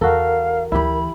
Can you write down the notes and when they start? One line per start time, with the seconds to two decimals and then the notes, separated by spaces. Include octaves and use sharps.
0.01 E2 F#4 A4 A#4 F5
0.72 D2 E3 E4 G4 B5